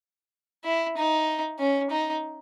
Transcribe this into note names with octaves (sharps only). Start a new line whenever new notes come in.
E4
D#4
C#4
D#4